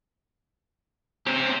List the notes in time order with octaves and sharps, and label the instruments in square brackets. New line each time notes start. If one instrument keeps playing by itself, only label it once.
[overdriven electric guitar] C4 C#4 [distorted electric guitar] G4 C5